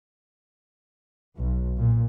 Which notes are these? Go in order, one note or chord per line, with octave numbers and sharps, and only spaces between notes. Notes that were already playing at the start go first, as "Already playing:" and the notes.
B1
A#2